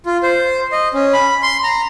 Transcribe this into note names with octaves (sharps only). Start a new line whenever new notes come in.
F4
C5
D#5
C#4
B5
C6
A#5